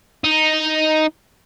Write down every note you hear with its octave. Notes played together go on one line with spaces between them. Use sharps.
D#4